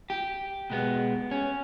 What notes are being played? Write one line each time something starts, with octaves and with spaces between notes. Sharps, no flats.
G4
B2 G#3 B3
C#4